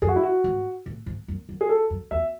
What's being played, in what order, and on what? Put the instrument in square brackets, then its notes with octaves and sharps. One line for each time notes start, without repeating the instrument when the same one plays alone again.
[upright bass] F#2 [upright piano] G#4
[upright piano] F#4
E4
F#4
[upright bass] G#2
A2
G#2
F#2
F#2
[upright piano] G#4
A4
[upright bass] F#2
[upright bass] E2 [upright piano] E5